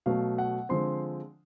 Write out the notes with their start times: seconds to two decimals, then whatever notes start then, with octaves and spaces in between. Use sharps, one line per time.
0.06 B2 F#3 A3 F5
0.38 F#5
0.69 D3 F3 G#3 C4 C6